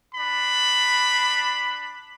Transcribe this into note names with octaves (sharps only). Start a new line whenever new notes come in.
D4 B5